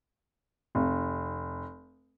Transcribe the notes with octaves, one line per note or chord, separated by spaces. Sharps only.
F1